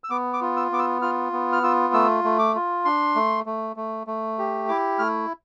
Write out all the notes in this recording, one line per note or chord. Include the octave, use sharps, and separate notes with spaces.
E6
B3 D6
D6
F4
E6
B3 D6
E6
F4 F6
B3
F6
F4 E6
A3 E6
A3
D6
F4
D4 C6
A3
A3
A3
A3
G4
E4 D6
A3 F6